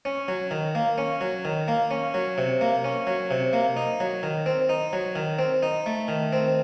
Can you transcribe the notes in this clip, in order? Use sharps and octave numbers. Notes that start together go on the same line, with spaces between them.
C#4
F#3
D#3
A#3
C#4
F#3
D#3
A#3
C#4
F#3
C3
A#3
C#4
F#3
C3
A#3
D#4
F#3
D#3
C4
D#4
F#3
D#3
C4
D#4
A3
D#3
C4